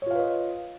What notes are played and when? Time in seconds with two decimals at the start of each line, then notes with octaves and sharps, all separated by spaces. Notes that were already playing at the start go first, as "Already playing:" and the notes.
0.02 C#5
0.06 F4
0.11 F5
0.15 B4
0.19 D#5